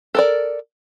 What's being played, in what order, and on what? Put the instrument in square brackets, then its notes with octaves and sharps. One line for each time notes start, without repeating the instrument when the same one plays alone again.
[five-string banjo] A4 A#4 D5